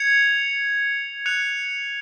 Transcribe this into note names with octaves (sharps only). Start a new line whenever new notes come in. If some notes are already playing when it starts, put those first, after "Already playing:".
Already playing: G#6 C#7 F7
F#6 C#7 F7